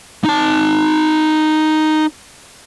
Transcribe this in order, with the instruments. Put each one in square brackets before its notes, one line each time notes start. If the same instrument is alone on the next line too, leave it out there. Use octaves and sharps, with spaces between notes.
[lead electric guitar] D#4 A5